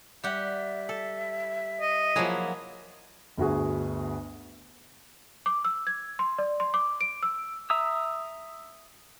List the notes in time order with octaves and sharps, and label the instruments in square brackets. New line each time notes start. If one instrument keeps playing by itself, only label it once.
[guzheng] G3 G4 F#5 [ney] E5
[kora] A4
[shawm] D#5
[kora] F3 G#4 [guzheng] F#3 A#3 E4
[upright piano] G1 D2 F#4 G#4
[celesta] D6
E6
G#6
C6
D5
C6
D6
D7
E6
[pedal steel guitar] E5 A#5 D#6 E6